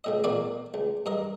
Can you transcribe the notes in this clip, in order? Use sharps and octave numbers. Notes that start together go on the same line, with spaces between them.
C#2 A2 D#5
E2 A#2 A#3 F#4 D5 F5
C#2
G2 A#4 D#5